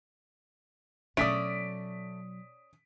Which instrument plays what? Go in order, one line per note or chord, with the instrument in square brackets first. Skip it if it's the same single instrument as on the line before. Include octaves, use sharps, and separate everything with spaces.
[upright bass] B2 F#3 [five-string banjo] A3 [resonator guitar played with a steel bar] C#4 D5 [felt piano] D#6 B6 D7